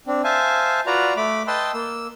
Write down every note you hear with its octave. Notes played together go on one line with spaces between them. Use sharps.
C4 D4
C5 E5 F5 G#5 A5
F4 F#4 B4 D5 A#5
A3 B5 D6
B4 D#5 G5 A5 C6 E6
A#3 E6